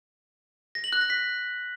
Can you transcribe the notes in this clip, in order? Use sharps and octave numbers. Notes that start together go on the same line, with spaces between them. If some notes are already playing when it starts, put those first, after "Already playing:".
A#6
F#7
F#6
A#6
B6